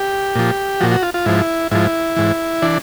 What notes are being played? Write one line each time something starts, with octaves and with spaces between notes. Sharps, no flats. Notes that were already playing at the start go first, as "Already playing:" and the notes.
Already playing: G4
A#2 F3
A#2 F3 F#4
F#4
F4
F4
G#2 F3 E4
G#2 F3 E4
G#2 E3
E3 D4